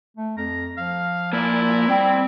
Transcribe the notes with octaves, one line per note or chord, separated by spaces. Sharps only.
A3
F2 A#5
F3 F5
A#3 E4 D5
G3 C4 G5